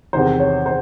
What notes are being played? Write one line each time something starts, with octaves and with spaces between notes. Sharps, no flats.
E2 C3 D#3 C5
C#5
C5